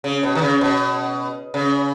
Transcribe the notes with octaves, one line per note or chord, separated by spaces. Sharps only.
C#3
B2
D#3
C#3
B2
C#3